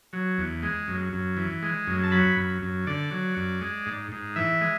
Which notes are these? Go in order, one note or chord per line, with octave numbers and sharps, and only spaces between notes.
F#3
E2
G#3
F#2
F#2
E3
G#3
F#2
A5
F#3 B5
F#2
F#2
D3 D5
F#3
F#2
G#3
G#2
G#2
E3 E5
G#3